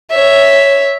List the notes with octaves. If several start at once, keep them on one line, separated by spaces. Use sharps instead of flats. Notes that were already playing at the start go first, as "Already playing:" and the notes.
C#5 E5